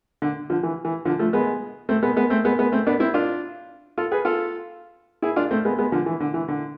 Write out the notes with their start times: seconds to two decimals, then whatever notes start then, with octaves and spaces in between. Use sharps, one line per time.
0.22 D3
0.50 D3 F3
0.63 E3
0.85 E3
1.05 D3 F3
1.19 F3 A3
1.33 G#3 B3
1.89 A3 C4
2.03 G#3 B3
2.16 G#3 B3
2.30 A3 C4
2.45 G#3 B3
2.58 G#3 B3
2.72 A3 C4
2.87 B3 D4
3.00 C4 E4
3.14 D4 F4
3.97 F4 A4
4.12 G#4 B4
4.25 F4 A4
5.22 E4 G#4
5.36 D4 F4
5.51 A3 C4
5.65 G#3 B3
5.78 G#3 B3
5.92 D3 F3
6.06 E3
6.20 D3
6.34 E3
6.48 D3